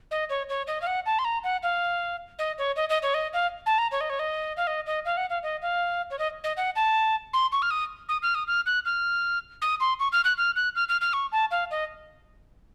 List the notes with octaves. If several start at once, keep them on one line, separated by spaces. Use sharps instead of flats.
D#5
C#5
C#5
D#5
F5
F#5
A5
C6
A#5
F#5
F5
D#5
C#5
D#5
D#5
C#5
D#5
F5
A5
A#5
C#5
D#5
C#5
D#5
F5
D#5
D#5
F5
F#5
F5
D#5
F5
C#5
D#5
D#5
F#5
A5
C6
C#6
F6
D#6
D#6
F6
D#6
F6
F#6
F6
D#6
C6
C#6
F6
F#6
F6
F#6
F6
F6
F6
C#6
A5
F5
D#5